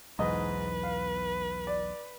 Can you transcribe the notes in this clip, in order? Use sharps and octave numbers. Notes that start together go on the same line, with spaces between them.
B1 E2 G#2 B4 D#5
F5
D5